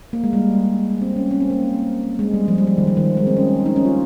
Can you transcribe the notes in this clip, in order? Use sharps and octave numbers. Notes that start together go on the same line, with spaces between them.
A#3
G#3
G3
C4
C#4
C#4
C4
A#3
G#3
G3
F3
G3
F3
D#3
F3
D#3
G#3
C4
C#4
D#4
C#4
F4